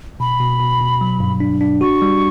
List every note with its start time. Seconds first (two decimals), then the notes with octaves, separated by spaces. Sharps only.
0.20 B2 B5
0.40 B2
0.60 B2
0.80 B2
1.01 F#3
1.20 G2
1.40 D4
1.61 D4
1.81 F#4 C#6
2.02 G3